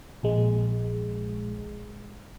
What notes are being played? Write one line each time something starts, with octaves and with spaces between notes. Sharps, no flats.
A#1 G#3